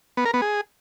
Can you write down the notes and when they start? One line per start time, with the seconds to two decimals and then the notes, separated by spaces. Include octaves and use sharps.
0.17 B3
0.25 A#4
0.34 B3
0.42 G#4